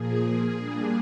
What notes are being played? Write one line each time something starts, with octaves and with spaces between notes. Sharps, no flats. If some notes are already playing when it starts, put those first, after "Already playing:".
Already playing: A#2 F3 A#3 G#4
A#2 G3 A#3 D4